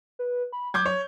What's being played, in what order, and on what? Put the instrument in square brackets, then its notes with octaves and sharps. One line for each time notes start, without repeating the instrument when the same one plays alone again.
[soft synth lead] B4
B5
[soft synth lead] F#3 [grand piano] D6 G6 G#6
[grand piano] C#5